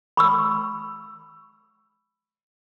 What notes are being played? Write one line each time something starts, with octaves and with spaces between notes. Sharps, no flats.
B5 C#6 E6